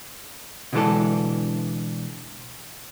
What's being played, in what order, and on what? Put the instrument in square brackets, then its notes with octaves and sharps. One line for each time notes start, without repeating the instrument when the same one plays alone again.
[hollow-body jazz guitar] B2 D3 E3 G#3 D4 A4